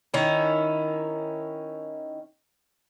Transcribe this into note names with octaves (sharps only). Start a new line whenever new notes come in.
D#3 C#4 E4